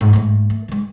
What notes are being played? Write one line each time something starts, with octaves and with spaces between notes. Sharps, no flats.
G#2
G#2 A3
A3
D#3 G#3